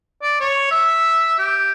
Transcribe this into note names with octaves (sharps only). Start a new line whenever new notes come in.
D5
C#5
E5
G4